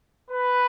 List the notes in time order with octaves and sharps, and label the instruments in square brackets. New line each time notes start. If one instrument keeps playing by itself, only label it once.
[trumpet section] B4